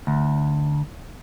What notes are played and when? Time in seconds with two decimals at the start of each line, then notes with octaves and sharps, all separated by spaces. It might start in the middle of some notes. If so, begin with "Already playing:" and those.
0.07 D2